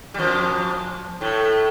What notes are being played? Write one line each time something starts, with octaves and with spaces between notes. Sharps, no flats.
G3
F2 F3
A2 A3